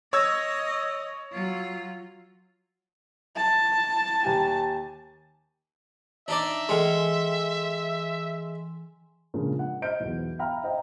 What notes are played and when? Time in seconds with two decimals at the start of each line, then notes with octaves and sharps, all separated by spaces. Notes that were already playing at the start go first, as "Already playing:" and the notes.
0.13 C#5 D#5 E6 G#6
1.32 F#3 F4
3.36 A5
4.23 D#2 G4 G#5
6.28 D4 D#4 D5 E5
6.69 E3 G#3 G#5 C6
9.34 A#2 C#3 F3 G#3 D4 F4
9.59 F#5
9.82 C5 D#5 F6 G6 D7
10.00 B1 E2
10.39 E5 F5 G5 A#5 B5 F6
10.64 C5 D#5 F5 G5 A#5